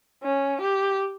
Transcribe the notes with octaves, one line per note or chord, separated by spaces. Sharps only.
C#4
G4